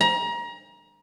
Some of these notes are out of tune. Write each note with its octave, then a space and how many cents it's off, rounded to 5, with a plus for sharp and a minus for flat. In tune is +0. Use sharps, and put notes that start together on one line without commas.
A#5 +30